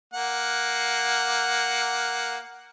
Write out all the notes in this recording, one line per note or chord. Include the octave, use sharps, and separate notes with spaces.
A#3 F#5